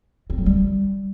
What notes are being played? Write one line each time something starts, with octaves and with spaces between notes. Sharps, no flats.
C4
F#3
G3